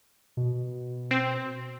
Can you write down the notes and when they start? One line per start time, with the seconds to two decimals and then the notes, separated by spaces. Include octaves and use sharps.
0.37 B2
1.11 C4